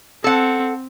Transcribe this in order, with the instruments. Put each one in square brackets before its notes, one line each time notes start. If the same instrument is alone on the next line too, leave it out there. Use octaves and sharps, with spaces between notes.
[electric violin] C4 [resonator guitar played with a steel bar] A4 F#5